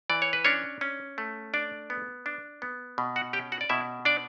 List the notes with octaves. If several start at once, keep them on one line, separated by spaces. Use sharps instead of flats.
E3 D5
C#5
B4
C#4 D4 C#5
C#4
A3
D4 D5
B3
D4
B3
B2
F#4 F#5
C#4 G4 G5
F#4 F#5
D5
B2 E4 E5
D4 D5